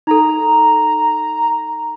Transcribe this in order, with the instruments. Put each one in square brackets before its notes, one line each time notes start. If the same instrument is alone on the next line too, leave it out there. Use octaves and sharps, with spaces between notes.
[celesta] D#4 A4 [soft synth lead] A#5